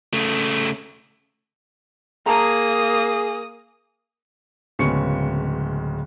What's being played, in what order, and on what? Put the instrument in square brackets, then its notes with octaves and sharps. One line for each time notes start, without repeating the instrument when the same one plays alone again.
[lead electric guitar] C#3 A3
[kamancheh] A#3 D#6 [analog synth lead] G#4 [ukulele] A5 A#5
[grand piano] D1 C#3 G#3 B3 C#6 C#7